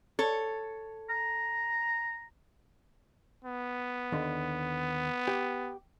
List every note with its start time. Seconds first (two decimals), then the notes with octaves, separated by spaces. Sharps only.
0.19 A4 C#5
1.10 A#5
3.44 B3
4.12 D#2 D3
5.28 G4